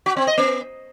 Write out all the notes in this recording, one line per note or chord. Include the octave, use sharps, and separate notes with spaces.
F#4
C4
D#5
B3